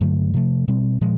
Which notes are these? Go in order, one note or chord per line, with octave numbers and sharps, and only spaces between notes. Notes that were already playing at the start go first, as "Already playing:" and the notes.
G2 D3 F#3 A3
C3 F3 A3
B2 G3 C4
A#2 F3 G#3